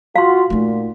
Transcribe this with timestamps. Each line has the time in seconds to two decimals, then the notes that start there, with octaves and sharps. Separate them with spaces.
0.16 F4 F#4 F5 C6
0.50 A#2 A3 D#4